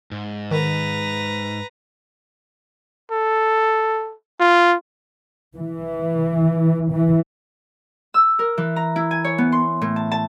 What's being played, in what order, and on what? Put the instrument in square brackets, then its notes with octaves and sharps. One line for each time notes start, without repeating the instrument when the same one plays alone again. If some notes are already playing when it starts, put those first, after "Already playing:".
[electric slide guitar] G#2
[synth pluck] D#3 [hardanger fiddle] B4 A#5
[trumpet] A4
F4
[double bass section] E3
E3
[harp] E6
A#4
E3
A#5
E4
G#5
C#5
B3
C6
A2
A5
A5